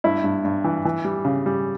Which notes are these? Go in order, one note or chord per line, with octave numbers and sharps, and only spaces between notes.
G2 E4
G2
G2
E3
E3
G3
C#3
G3